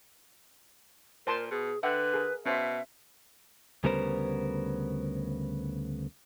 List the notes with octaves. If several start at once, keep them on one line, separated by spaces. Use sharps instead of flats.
A#2 A#4 C5 A5 C6
B2 G#4
D3 B4 E5 F#5 G5
G#4 A#4
B2 C#4 C5 E5
D2 C#3 G3 B3 A#4 C5